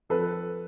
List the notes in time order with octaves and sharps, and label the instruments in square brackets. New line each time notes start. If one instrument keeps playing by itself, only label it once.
[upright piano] F2 A4 B4